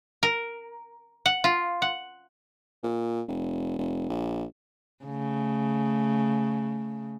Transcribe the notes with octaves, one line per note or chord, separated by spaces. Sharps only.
A#4
F#5
F4
F#5
A#2
F1
F1
A#1
C#3 A3